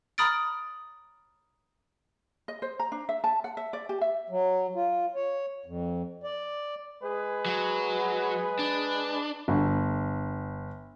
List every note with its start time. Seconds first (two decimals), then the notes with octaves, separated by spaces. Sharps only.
0.18 A#5 B5 D#6 F6 A6 D7
2.48 D#5
2.62 C5
2.79 A#5
2.92 D4
3.09 E5
3.24 A5
3.44 F#5
3.57 E5
3.73 D5
3.89 G4
4.01 E5
4.30 F#3
4.75 F4
5.15 C#5
5.66 F2
6.24 D5
7.02 G#3 G#4 B4
7.46 F#3
8.59 D4
9.48 G1